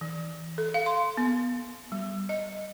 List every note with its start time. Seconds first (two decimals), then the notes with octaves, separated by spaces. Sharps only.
0.01 E3
0.58 A4
0.74 F5
0.86 C6
1.17 B3
1.92 G3
2.29 D#5